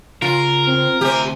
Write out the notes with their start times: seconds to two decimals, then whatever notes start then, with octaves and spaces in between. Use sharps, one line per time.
0.22 C#3 F4 A#4 C#5
0.67 C4
1.01 D2 C3 C4 G4 G#5